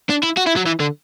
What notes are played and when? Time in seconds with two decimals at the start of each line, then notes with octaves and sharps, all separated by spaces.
0.10 D4
0.23 E4
0.37 F#4
0.47 E4
0.57 F#3
0.66 E3
0.80 D3